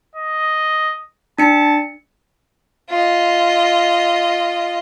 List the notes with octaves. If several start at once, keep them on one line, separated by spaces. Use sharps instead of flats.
D#5
D4 A5 C#7
F4 D#5